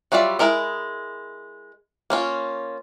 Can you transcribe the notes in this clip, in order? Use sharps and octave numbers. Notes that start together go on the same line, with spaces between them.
F#3 G3 F4 D5 E5
G#3 E4 A#4 D#5
A#3 C#4 F4